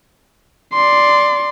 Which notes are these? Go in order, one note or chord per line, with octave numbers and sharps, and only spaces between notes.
D5 C6